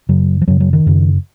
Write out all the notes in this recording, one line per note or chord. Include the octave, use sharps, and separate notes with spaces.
F#2 C#3 F#3
F3
F#2 C#3 F#3
F#3
D#3
F#2 C#3